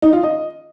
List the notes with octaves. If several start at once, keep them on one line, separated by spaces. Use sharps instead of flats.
D#4
F4
D#5